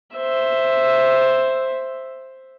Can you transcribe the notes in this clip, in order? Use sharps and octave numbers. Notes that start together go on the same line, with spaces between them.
C5 E5